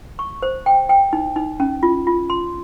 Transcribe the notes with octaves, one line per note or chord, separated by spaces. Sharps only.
C#6
C5
G5
G5
D#4
D#4
C#4
F4
F4
C6